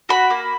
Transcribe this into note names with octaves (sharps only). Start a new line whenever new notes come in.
F#4 B5
A#3